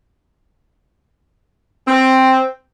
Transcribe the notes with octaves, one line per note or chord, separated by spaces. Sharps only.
C4